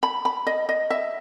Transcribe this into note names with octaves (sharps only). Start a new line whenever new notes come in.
B5
B5
D#5
D#5
E5